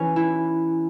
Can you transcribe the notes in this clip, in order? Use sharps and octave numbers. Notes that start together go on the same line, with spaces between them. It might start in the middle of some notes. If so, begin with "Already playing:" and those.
Already playing: E3 C#4
E4